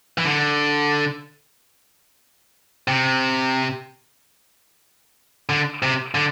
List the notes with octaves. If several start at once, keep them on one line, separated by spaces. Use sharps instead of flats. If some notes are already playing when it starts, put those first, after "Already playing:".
E3
D3
C3
D3
C3
D3